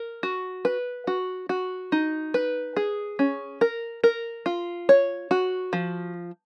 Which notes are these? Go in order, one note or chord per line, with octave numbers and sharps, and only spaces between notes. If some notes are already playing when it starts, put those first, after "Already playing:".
Already playing: A#4
F#4
B4
F#4
F#4
D#4
B4
G#4
C#4
A#4
A#4
F4
C#5
F#4
F3